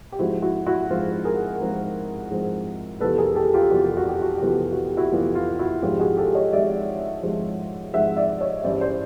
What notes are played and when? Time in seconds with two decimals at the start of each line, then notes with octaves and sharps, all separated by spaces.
0.12 G4
0.19 G#2 F3 G#3 C4 E4 F#4
0.42 E4 F#4
0.66 E4 F#4
0.90 G#2 F3 G#3 C4 F4
1.25 G#4 A#4
1.61 G#2 F3 G#3 C4
2.30 G#2 F3 G#3 C4
3.00 F2 C3 E3 G3 B3 A4 B4
3.18 G#4 A#4
3.36 G4 A4
3.54 F4 G4
3.71 F2 C3 E3 G3 B3 F#4
3.84 G4
3.97 F#4
4.09 G4
4.22 F#4
4.35 G4
4.42 F2 C3 E3 G3 B3 F#4
4.59 G4
4.72 F#4
4.85 G4
4.97 E4 F#4
5.12 F2 C3 E3 G3 B3 F4
5.35 F4
5.59 E4 F#4
5.82 G#1 G#2 F3 G#3 F4 G4
6.00 F#4 G#4
6.17 G4 A4
6.35 C#5 D#5
6.53 G#1 G#2 F3 G#3 D5 E5
7.23 G#1 G#2 F3 G#3
7.93 G#1 G#2 F3 G#3 E5 F#5
8.17 D5 E5
8.41 C#5 D#5
8.64 G2 E3 G#3 C#4 E4 C5 D5
8.81 C5 D5